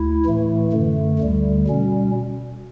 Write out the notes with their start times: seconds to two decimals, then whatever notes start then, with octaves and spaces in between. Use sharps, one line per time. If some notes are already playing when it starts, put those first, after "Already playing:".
Already playing: D2 E4
0.25 A2 E3 A3
0.72 F#2 D3 A3
1.19 D2 D3 G3
1.67 B2 G3 C#4